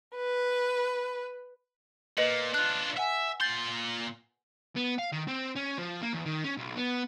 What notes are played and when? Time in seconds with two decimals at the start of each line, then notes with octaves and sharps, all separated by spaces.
0.15 B4
2.17 A#2 B4 D#5 F#7
2.54 D4 F4 F#6
2.97 E5 F#5 G#5
3.41 A#2 C6 G6 A6 F#7
4.76 B3
4.98 F5
5.12 D#3
5.28 C4
5.56 C#4
5.78 F3
6.01 A#3
6.13 E2
6.25 D#3
6.44 C#4
6.57 B1
6.77 B3